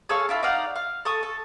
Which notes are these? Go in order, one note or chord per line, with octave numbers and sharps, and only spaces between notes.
G#4 A4 C#5 F5
D4 E4 F4 A4
D#4 D5 F5 F#5
F5
A4 C#6 D#6
A4